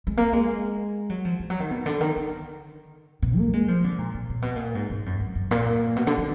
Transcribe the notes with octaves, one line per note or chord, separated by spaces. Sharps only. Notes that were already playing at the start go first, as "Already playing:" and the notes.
G#3
A#3
G#3
F#3
F3
F3
F#3
D#3
B2
D3
D#3
D3
B2
A#3
G#3
F3
D3
A#2
A#2
A#2
B2
A#2
G#2
G#2
F#2
F#2
F#2
A#2
B2
D3
D#3